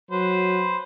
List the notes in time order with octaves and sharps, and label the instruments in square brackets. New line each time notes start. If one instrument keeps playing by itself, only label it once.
[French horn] F#3 [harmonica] B4 C5